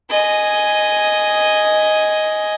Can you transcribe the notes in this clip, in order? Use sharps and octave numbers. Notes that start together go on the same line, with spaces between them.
D#5 G#5